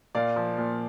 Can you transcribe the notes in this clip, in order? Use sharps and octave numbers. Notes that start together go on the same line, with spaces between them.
A#2 D5 F5
F3
A#2